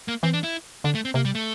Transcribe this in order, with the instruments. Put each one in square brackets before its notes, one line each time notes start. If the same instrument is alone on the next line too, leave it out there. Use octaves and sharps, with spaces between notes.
[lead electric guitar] A#3
[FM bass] E3 [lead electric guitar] C4
[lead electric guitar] D4
E4
[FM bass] D3 [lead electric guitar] D4
[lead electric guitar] A3
C4
[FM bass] C3 [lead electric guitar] A#3
[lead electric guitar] G3
A3